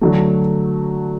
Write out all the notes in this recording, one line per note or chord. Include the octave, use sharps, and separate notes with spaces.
D3 F#3 A3